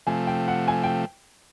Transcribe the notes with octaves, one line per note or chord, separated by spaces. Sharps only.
C3 F3 A3 G#5
G5
F#5
G#5
G5